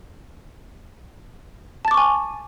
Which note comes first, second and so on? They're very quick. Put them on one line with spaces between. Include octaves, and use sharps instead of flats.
A5 A6 D6 C#6 G#5